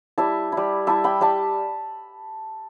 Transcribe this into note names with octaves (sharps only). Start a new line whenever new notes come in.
G3 E4 E5 A5
E4
G3
G3 E4 E5 A5
G5 B5
G3 E5 A5